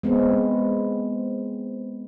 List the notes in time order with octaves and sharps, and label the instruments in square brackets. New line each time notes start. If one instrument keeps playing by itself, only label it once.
[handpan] G#3 B3 C4